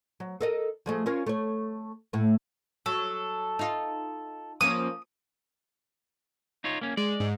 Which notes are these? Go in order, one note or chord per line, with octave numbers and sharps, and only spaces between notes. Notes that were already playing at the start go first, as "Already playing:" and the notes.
F#3
A4 A#4 D#5
F3 G#3 A3
C#4 F4 A#4
A3 C#5
A2 A3
F#3 A4
D#4 F4
F3 A#3 C#4 D#6
D#4 F4 C#5
A#3 C#4
G#3 D5
G#2